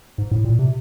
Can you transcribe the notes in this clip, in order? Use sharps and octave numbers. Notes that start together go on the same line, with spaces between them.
G#2
A2
A#2
C3